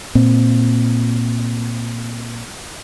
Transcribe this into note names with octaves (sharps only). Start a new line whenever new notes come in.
A#2 C4